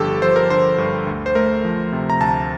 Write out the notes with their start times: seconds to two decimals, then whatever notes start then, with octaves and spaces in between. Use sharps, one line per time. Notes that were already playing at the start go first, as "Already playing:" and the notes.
Already playing: G1 G2 D3 F3 G4 A4
0.22 F3 C5
0.36 A#4
0.50 D3 C5
0.78 G2
1.07 D2
1.26 C5
1.35 A3 A#4
1.64 F3
1.92 C3
2.10 A#5
2.20 D2 A5